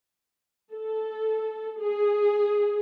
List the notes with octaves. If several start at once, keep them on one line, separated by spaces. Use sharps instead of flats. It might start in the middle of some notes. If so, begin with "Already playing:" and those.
A4
G#4